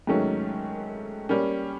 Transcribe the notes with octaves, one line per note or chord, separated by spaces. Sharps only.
G#2 D#3 F#3 A3 C#4
G3 A#3 C#4